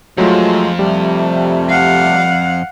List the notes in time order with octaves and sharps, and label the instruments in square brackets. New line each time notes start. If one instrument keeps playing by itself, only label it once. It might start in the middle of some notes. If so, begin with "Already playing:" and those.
[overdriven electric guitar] F2 [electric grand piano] F#3 A3 F4 [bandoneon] G#3
[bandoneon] C3 A3 [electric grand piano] G3
[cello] F5 F#5